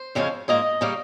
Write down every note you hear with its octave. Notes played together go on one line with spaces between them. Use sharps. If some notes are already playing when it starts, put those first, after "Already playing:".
Already playing: C5
F2 C#3 F3 G#3 C#4
G#2 F3 A#3 D#5
C#3 G3 A#3 C#4